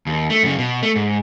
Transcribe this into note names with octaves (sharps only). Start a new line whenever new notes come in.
D#2
A3
F#2 C#3
B2
A3
G#2